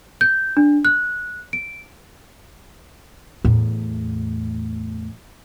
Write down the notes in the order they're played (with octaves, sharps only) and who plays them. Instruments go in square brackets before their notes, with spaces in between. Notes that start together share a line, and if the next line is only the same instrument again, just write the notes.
[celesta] G6
D4
F#6
D7
[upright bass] E2 A2